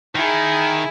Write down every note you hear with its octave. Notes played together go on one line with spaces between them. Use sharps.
D#3 E4 G#4